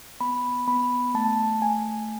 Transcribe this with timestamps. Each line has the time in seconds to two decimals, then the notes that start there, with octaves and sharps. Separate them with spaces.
0.20 B3 B5
0.68 B3 B5
1.14 A3 A5
1.61 A3 G#5